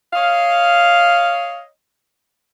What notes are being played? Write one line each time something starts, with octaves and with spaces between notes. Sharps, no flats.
C#5 D#5 F5